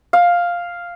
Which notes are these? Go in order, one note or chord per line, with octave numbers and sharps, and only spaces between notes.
F5